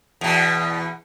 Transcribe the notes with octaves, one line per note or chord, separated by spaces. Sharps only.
E2 B2